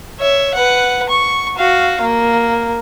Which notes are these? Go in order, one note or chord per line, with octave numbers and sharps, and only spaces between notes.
C#5 E5
B4 F#5
C#6
F#4 F5
A#3